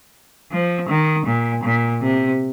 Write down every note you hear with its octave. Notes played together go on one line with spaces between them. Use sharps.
F3
D#3
A#2
A#2
C3